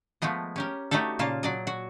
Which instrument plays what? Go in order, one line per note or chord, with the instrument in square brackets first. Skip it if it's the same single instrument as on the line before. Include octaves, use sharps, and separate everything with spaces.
[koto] F3 G#3 A3 B3 D#5
C#4 G4 A#4
A3 D#4 F#4 G4 A4
A#2 C#3 A#3 F4 A5
F#3 D5 D#5
F#4